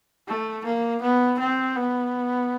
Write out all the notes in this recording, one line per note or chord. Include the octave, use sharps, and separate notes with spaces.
A3
A#3
B3
C4
B3